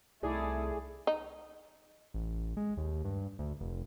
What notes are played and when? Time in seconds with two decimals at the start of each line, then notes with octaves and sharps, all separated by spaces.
0.23 C2 A3 D#4 E4 G#4 D5
1.07 D#4
2.14 A1
2.57 G#3
2.77 D#2
3.05 G2
3.39 D2
3.61 F1